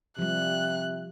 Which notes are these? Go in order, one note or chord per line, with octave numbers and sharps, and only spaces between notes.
C3 F3 G3 F#6